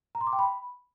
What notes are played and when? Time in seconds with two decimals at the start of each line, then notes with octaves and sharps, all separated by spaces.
0.15 A#5
0.21 C6
0.27 D6
0.33 G5
0.39 B5